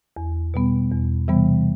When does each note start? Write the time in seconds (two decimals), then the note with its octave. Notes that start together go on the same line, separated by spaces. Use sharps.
0.17 E2
0.54 B2 G3 B3
0.91 E2
1.28 C3 E3 G3 B3